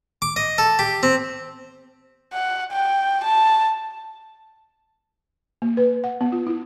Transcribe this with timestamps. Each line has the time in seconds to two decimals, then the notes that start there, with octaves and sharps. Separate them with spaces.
0.22 D6
0.36 D#5
0.58 A4
0.79 G4
1.03 C4
2.33 F#5
2.72 G5
3.24 A5
5.62 A#3
5.77 B4
6.04 F#5
6.21 B3
6.32 F4
6.47 E4